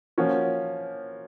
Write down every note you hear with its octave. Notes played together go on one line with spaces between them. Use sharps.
F3 A#3 C#4 F#4